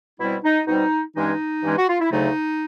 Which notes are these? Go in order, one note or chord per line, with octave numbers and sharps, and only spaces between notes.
B2 G3 C4 E4
D#4
B2 G3 C4 D#4
G2 E3 G#3 C#4 D#4
G2 E3 G#3 C#4
F#4
F4
E4
D2 C#3 F#3 A3 D#4